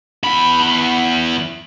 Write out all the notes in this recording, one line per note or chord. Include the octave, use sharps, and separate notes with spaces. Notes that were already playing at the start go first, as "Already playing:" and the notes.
E2 B5